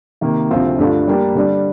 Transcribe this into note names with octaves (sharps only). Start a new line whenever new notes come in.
C3 D#3 A#3
D2 C3 F3 C4 F4
G2 D3 A3 D4 F4
G3 A#3 D4 G4
D3 G3 D4